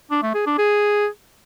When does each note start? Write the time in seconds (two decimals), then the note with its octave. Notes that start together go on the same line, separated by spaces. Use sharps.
0.11 D4
0.22 A3
0.34 G#4
0.46 D4
0.58 G#4